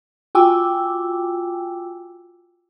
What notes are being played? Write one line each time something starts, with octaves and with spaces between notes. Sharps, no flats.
F4 F#4 G5 G#5 D6 E6